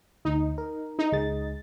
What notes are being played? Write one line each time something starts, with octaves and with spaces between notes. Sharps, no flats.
D2 D#4
A#4
D#4
C#2 G#3 A6